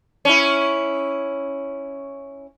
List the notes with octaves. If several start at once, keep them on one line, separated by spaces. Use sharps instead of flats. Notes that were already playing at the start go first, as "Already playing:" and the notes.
C#4 E4